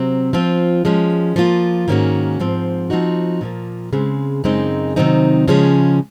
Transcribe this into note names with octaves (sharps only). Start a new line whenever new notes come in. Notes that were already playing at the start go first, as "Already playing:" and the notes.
Already playing: C3 F#3 C4
F3 C4 F4
F3 G#3 C#4
F3 A#3 F4
G#2 D#3 A#3 C#4 F#4
G#2 F3 C4
F3 C4 D#4 F#4
A#2 F3 A#3
C#3 G#3 C4
F#2 C#3 G#3 C4 D#4
C3 D#3 F#3 C4 D#4
C#3 F3 G#3 C#4 G#4